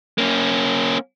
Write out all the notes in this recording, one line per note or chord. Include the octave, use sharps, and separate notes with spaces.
A#3 C#4